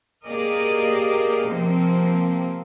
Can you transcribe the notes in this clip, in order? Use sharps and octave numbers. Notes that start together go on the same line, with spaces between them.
A#3 G4 G#4 A#4 D5 D#5
C3 F3 A#3 C4